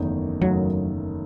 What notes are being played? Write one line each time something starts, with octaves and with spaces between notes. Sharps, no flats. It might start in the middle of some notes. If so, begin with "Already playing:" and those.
Already playing: F#1 E2 D#3 A3 D#4
F#1 E2 D#3 F#3 A3 D#4